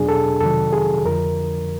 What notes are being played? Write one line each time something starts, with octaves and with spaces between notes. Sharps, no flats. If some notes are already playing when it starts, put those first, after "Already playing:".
Already playing: E2 B2 F#3 D4 G#4
A4
F2 C3 D#3 F#3 A4
G#4
F2 D3 F3 A#4